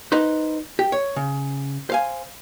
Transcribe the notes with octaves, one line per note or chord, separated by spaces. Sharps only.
D#4 B4 C5
G4
C#5
C#3
C5 F5 G#5